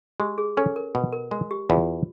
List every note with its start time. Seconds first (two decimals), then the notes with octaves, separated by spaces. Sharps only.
0.20 G#3 G4
0.38 G#4
0.57 C#4 A4
0.76 A#4
0.95 B2
1.13 A#4
1.31 G#3 A#4
1.51 G4
1.69 E2 F4